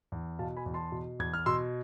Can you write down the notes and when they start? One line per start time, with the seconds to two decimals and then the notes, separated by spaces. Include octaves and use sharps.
0.12 E2
0.39 B2 F5 A5
0.57 G#5 B5
0.66 E2
0.74 A5 C6
0.92 B2
1.19 E2 G#6
1.34 F6
1.46 B2 C6 E6